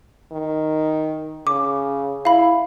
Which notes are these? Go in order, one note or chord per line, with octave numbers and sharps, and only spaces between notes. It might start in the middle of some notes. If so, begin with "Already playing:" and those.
D#3
C#3 D6
E4 F5 B5